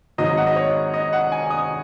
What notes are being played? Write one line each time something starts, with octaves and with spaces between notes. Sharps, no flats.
G#1 G#2 D#3 F#3 D#5
F#5
D#5
C#5
D#5
F#5
G#5
D#6